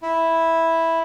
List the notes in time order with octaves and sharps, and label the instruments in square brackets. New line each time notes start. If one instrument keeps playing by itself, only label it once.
[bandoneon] E4